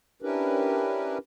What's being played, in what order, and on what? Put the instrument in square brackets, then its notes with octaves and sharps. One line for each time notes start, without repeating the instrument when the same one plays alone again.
[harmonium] C#4 D4 E4 G4 A#4 B4